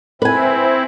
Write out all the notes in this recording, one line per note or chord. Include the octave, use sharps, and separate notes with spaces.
C4 E4 B4 G#5